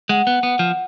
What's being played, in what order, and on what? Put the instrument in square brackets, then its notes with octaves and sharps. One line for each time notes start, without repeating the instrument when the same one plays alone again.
[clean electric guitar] G#3 [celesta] F#5
[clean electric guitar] B3
[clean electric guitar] B3 [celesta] F#5
[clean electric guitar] F3